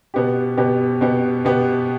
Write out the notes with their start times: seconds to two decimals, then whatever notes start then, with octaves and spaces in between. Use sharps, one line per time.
0.14 B2 B3 G4
0.58 B2 B3 G4
1.01 B2 B3 G4
1.45 B2 B3 G4